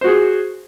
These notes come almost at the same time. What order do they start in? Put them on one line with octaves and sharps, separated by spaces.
C5 F#4 G#4